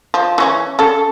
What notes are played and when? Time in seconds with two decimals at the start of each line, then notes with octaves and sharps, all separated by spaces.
0.14 F3
0.38 E3 C#4 G#5
0.79 C#4 A4